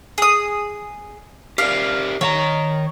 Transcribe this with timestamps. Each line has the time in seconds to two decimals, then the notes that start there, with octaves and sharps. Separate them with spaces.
0.18 G#4 D#6
1.58 G4 A#4 D5 F5
2.21 D#3 C#5 F5 A#5